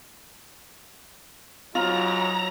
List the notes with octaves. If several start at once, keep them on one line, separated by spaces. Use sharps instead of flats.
G#2 F#3 F4 A#5